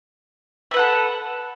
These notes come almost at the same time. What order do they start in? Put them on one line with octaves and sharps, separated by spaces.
E5 B4 F#5 A4